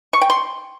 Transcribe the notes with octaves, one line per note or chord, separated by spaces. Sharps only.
C#6
G5
C6